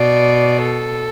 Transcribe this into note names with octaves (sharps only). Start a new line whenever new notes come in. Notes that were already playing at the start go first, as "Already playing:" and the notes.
Already playing: B2 D5
A4